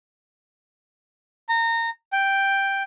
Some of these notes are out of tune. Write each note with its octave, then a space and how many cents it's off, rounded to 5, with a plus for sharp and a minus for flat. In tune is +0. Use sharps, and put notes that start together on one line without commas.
A#5 -25
G5 +0